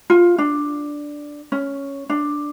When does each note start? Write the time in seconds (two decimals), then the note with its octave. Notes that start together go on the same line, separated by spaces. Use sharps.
0.10 F4
0.38 D4
1.52 C#4
2.10 D4